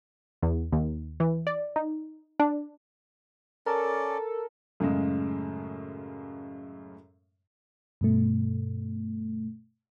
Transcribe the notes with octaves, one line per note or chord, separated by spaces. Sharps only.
E2
D#2
E3
D5
D#4
D4
C#4 A4 A#4 D5
F#2 A2 C#3 G#3
G2 B2 A3